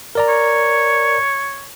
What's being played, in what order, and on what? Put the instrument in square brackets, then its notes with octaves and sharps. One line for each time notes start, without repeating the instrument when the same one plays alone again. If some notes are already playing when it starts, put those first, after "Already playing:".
[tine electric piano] A#4 D5 A#5
[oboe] C#5